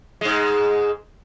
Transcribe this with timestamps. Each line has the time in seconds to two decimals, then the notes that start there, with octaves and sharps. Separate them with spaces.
0.21 G#2 G#3